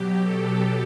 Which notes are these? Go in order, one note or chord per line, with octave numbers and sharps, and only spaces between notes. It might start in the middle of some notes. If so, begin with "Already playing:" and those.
Already playing: B2 F#3 G4
A4